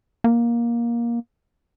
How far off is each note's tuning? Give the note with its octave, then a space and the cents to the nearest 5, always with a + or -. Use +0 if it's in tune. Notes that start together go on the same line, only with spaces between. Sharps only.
A#3 +15